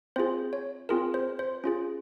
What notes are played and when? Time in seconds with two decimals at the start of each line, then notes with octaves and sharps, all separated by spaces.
0.16 C4 F4 G#4 C5
0.53 C#5
0.89 C4 F4 G#4 A#4
1.14 C5
1.39 C5
1.64 C#4 F4 G#4